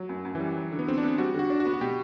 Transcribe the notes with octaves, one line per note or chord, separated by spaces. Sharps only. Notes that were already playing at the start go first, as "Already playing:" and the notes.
Already playing: F#3
F#2
F#2
E3 G3
F#3
D3
B3
D3 C4
D4
B3
G3 F#4
D3
F#4
D4
F#4
B3
F#4
B2 G4